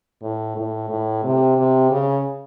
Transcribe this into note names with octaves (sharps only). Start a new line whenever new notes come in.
A2
A2
A2
C3
C3
C#3